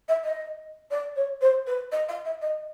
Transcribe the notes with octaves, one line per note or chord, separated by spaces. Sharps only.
E5
D#5
D5
C#5
C5
B4
D#5
F5
E5
D#5